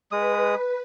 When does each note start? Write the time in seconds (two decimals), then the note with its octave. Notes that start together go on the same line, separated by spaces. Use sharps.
0.12 G#3 B4 D#6